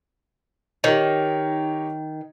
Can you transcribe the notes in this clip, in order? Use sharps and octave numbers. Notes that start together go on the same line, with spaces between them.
D#3 G4 A#4 C#5